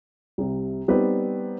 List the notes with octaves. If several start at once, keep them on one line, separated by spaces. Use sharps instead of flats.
C2 C3
G3 B3 C4 D#4 G4 B4